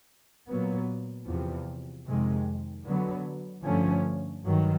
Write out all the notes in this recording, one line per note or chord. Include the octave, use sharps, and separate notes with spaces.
A#2 F#3 B3
E2 C3 F3
F2 C3 D#3 G#3
D3 F#3 B3
G2 D3 F3 A3 C#4
G2 D#3 F#3